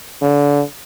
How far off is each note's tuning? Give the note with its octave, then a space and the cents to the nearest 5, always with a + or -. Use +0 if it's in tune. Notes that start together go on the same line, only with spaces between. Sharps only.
D3 -30